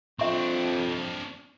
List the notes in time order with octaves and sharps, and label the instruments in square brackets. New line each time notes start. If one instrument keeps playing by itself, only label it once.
[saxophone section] F2 [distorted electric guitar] C4 D4 [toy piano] E5 C#6